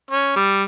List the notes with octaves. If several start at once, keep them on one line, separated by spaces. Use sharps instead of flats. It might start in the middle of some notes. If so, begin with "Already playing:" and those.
C#4
G3